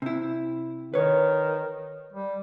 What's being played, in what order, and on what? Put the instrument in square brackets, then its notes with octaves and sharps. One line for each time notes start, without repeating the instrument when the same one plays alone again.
[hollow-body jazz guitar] C3 E4
[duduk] D#3 [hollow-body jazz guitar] B4 C#5
[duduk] G3